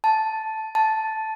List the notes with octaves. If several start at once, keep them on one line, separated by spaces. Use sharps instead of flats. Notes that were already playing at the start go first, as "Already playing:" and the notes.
A5
A5